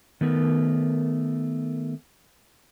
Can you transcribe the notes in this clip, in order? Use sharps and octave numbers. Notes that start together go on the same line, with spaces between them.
D#3 A3 B3 A#4